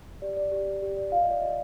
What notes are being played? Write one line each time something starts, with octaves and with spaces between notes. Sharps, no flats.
G4 D5
D5
G4
G4
G4
D5
F4 F5
D#5
F4 D5
F4 D#5